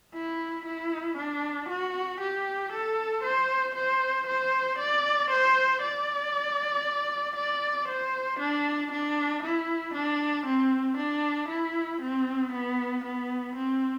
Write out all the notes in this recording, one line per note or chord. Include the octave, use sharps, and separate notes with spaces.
E4
E4
D4
F#4
G4
A4
C5
C5
C5
D5
C5
D5
D5
C5
D4
D4
E4
D4
C4
D4
E4
C4
B3
B3
C4